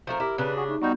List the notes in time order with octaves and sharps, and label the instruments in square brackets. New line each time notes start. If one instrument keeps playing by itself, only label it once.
[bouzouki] F3 A3 A#4
[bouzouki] E4 [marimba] G4 A#5 D6 [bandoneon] A#4
[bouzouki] C#3 D4 [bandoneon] B4
[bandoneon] F#4 G#4
[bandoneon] A3 [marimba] D#4
[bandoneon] G3 D#4 F#4 [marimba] B3 G6